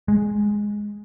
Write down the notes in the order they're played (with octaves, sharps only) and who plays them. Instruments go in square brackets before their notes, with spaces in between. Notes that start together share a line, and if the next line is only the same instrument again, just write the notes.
[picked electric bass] G#3